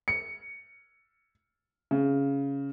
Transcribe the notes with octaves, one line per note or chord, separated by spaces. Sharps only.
C#7
C#3